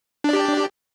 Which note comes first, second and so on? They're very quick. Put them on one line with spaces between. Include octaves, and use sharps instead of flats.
D4 D5 G4